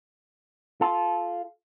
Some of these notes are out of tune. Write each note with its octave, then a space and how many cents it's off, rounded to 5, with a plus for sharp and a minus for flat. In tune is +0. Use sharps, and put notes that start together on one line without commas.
F4 +0 A4 -20